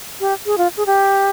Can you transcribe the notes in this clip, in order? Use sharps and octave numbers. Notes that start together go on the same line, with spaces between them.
G4
G#4
F4
G#4
G4